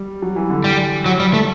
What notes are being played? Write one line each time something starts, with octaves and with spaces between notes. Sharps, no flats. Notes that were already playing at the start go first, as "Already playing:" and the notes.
Already playing: G3
F#3
E3
D3
G3
F#3
G3
A3